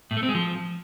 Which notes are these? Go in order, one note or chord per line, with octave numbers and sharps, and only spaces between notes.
A2
A3
C4
G#3
F3